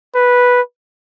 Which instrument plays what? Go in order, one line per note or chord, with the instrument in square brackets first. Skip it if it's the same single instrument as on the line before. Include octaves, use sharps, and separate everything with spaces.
[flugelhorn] B4